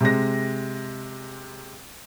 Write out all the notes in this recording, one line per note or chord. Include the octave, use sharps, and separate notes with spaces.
C3 G#3 A#6